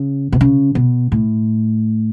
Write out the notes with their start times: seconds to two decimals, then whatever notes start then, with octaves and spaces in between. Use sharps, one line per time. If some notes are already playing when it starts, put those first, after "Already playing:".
Already playing: C#3
0.32 B2
0.41 C#3
0.75 B2
1.12 A2